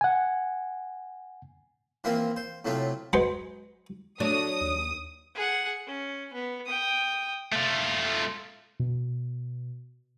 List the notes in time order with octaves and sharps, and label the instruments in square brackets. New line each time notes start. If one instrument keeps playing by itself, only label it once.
[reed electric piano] F#5 G#5
[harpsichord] E3 F3 A#3 C4 E4 A#4
C5
A2 C3 F#3 A3 C4 F4
F#3 G#3 B4 C5
[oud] F#3 D4 [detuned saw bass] A3 [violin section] D#6
[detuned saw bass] D#2
[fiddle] G#4 F#5
C#4
B3
G5 D#6
[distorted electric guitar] A3 F4
[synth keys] B2